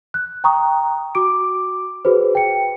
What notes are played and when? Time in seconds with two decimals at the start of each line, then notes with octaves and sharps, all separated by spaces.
0.14 F#6
0.44 G5 A#5 C#6 D#6
1.15 F#4 D6 D7
2.05 F#4 G#4 B4 C5
2.35 G5 C#7